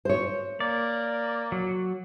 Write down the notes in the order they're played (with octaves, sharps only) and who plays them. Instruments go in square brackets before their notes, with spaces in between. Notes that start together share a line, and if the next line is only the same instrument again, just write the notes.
[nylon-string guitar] C5 C#5
[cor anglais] A#3 [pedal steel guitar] D5
[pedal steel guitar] F#3